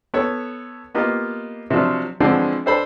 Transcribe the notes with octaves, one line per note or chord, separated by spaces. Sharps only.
B3 A4 C#5
A#3 B3 F4 G4 D#5
C3 F3 F#3 D4 F4
D3 E3 F3 G#3 C4 D4
D4 A4 C5 A5 B5